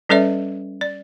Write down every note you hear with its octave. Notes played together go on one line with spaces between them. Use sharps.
G3 C#4 A4 B4 D5 E5
D5